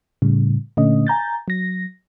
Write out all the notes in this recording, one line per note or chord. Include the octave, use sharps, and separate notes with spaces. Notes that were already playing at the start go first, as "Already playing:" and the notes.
A2 C#3 G3
A#2 D3 A3 C#4 D#5
G#5 A#5 G6 A6
F#3 A#6